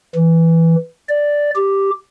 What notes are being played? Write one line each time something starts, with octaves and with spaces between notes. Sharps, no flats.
E3
D5
G4